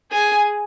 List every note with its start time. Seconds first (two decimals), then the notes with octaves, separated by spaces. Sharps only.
0.12 G#4 G#5